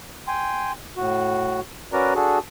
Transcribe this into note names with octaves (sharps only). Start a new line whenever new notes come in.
G5 G#5 C6
A2 F#4
C#4 F#4 A#4 B4 D5 A#5
D4 F#4 G#4 A4